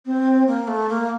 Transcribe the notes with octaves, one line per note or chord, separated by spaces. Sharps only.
C4
A#3
A3
A#3